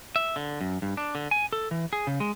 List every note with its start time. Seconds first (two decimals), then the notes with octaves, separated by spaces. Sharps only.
0.16 E5
0.36 D3
0.61 F#2
0.82 G2
0.97 D4
1.15 D3
1.31 G#5
1.53 A4
1.71 E3
1.93 G#4
2.07 C#3
2.20 G#3